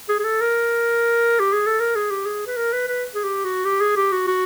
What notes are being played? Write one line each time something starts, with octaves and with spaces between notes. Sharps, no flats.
G#4
G#4
A4
A#4
G4
G#4
A4
A#4
G#4
G4
G#4
B4
A#4
B4
B4
G#4
G4
F#4
G4
G#4
G4
F#4
F#4